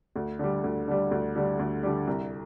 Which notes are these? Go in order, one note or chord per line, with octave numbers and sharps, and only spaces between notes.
D2
D3 G3
D2
D3 G3
D2
D3 G3
D2
D3 G3
C2